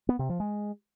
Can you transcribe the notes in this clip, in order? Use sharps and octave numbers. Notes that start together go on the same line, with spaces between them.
B3
C3
F3
G#3